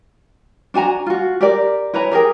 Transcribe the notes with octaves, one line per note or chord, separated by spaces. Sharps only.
D4 F#4 G#5 A#5
F4 F#4
G4 A#4 D5
E4 B4 C#5 A#5
G4 G#4 A#4 G5